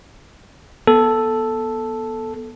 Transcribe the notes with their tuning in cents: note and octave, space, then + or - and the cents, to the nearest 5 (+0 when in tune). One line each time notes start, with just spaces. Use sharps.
B3 -20 A4 +0